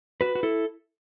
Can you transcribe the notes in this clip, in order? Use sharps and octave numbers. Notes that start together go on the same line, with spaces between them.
F#4 B4
F#4
E4 A4